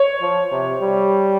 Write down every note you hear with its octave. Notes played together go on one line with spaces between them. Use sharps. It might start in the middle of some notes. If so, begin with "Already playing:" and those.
Already playing: C#5
F3
C3
G3